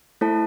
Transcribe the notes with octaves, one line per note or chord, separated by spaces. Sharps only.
A3 E4 A4 C5 A5